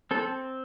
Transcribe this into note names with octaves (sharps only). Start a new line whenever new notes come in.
C4 A4